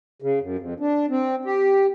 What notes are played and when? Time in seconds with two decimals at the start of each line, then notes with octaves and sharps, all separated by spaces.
0.22 C#3
0.40 F#2
0.59 F2
0.80 D4
1.10 C4
1.45 G4